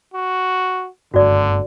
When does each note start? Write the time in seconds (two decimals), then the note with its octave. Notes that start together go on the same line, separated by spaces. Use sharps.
0.14 F#4
1.14 F#1 G2 D3 A3 F#4 D5